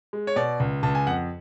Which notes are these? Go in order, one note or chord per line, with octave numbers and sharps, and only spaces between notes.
G#3
C#5
B2 D5
C#2
C#2 A5
G#5
F2 F#5